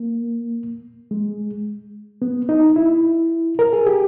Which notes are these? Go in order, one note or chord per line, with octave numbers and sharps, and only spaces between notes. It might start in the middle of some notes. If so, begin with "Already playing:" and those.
Already playing: A#3
G#3
B3
D#4
E4
A#4
G#4
G4